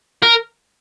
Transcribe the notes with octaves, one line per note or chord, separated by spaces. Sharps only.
A#4